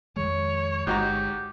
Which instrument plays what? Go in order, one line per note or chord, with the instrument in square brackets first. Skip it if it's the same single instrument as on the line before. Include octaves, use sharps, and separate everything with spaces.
[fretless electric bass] F2 D#3 G#3 [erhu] C#5
[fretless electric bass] G1 G#3 [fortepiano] G#2 F#4 A#5 [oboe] G4